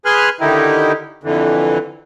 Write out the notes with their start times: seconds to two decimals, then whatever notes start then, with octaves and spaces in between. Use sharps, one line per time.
0.05 G#4 B4 G#5 C6 F6 F#6
0.41 D3 D#3 D#4 E4 G4
1.24 F2 D3 E3